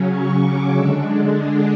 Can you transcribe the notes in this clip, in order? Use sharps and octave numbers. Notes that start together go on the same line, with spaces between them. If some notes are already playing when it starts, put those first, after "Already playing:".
Already playing: C#3 F#3 C#4
C#6
D6
D3 G#3 D4 E6